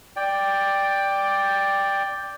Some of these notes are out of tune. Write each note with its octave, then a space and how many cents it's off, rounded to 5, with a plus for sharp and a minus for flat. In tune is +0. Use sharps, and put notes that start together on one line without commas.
D5 +0 G5 +10